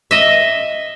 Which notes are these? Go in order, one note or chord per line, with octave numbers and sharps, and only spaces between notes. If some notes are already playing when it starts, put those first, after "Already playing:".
D#5 E5